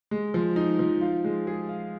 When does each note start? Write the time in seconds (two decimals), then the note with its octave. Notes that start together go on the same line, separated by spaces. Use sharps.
0.11 G#3
0.34 F3
0.56 D#4
0.79 F3
1.01 F4
1.24 G#3
1.47 G#4
1.69 F5